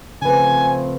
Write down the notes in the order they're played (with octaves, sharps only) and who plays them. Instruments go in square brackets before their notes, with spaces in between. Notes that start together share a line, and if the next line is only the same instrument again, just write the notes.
[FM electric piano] C#3 B4 [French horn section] F3 A3 C4 [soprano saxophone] G#5